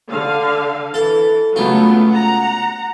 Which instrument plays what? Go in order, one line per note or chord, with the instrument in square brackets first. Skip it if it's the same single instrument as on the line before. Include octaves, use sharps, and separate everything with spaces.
[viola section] D3 F5
[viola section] E3 [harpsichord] A4
[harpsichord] C#2 F4 [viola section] F#3 A3 B3
[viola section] F#5 A#5